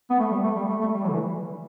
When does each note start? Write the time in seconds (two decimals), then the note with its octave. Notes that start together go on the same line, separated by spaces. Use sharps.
0.10 B3
0.19 A3
0.31 G3
0.44 A3
0.56 G3
0.69 A3
0.81 A3
0.94 G3
1.04 F#3
1.08 D3
1.13 E3